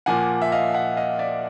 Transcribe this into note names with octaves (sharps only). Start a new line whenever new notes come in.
A#2 F3 A#3 F#5 G#5
E5
D#5 F5
E5 F#5
D#5 F5
D5 E5